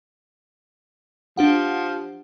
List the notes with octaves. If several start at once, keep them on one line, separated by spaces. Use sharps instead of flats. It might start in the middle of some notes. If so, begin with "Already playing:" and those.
F3 D4 G4 F#5